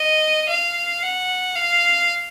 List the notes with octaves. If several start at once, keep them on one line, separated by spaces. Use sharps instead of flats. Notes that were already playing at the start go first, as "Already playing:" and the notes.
Already playing: D#5
F5
F#5
F5